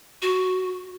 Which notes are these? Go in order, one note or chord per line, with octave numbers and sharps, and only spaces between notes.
F#4